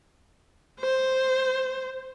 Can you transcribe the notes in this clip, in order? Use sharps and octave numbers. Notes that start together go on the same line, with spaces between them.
C5